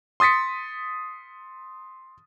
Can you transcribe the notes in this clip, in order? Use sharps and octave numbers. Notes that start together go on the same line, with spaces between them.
C6 D#6 A6 B6 C#7